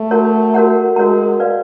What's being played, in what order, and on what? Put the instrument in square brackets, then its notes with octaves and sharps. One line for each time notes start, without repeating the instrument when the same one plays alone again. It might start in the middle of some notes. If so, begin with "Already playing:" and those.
Already playing: [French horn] A3
[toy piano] F#4 A#4 C#5 F#5 A#5
F#4 A#4 C#5 F#5 A#5
[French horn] G#3 [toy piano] F#4 A#4 C#5 F#5 A#5
[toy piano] B4 D5 F5